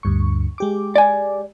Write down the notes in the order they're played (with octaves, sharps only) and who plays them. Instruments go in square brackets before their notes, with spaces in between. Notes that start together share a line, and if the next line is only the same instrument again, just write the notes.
[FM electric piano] D2 G2 C#6
G#3 G4 D6
[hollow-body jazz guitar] D5 G#5